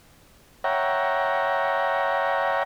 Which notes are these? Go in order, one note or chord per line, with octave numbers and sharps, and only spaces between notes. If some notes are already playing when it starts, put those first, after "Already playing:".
C#5 E5 F#5 G5 A#5